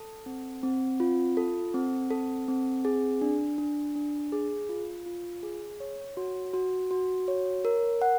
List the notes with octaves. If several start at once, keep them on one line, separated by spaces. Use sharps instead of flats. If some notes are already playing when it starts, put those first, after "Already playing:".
Already playing: A4
C4
C4
F4
A4
C4
A4
C4
G#4
D4
D4
D4
G#4
F4
F4
G#4
C#5
F#4
F#4
F#4
C#5
A#4
F#5